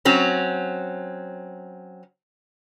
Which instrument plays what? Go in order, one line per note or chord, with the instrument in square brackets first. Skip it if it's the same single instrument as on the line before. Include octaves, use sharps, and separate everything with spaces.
[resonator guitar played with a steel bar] F#3 C4 C#4